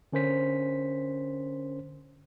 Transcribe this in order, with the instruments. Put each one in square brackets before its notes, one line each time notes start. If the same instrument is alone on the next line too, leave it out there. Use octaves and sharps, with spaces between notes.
[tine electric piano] D3 C#4 A#4 C5 B6